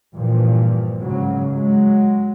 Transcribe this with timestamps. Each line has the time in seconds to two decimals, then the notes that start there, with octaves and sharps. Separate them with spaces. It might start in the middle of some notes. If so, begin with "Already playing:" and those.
0.16 G2 A#2 E3 F3
1.03 G#2 C#3 F#3
1.53 F#3 G#3